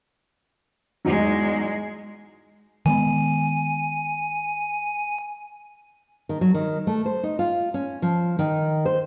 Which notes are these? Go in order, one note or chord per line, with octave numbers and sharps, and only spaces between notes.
E2 G#2 F#3 G#3
D#3 G#3 B3 G#5
D#3
F#3
D#3
A3
C5
D#4
F4
C#4
F3
D#3
C5